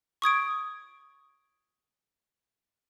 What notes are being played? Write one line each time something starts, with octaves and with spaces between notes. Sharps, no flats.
C#6 D#6 G#6 D7